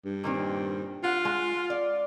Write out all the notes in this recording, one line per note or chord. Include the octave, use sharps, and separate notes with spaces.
G2
A#2 D#3 C4
F4 F#5
G#3
D5